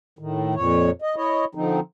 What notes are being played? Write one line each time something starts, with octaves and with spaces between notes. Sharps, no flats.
A2 D#3
F2 A#2 C#5
D#5
E4 C#5 D#5
D3 F3 C4 D#4